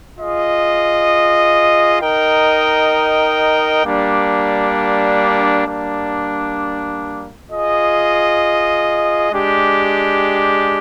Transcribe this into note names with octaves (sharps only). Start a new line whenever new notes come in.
F4 G#4 D#5
D#4 A#4 D#5 G5
G3 A#3 D4
G3 A#3 D4
F4 G#4 D#5
G#3 D4 G4